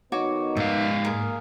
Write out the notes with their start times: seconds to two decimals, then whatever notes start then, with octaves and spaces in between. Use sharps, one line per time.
0.12 D#3 B3 D#4 F#4 C#5 D6
0.57 G#2 E5 F5
1.05 A#3 G#4 A#4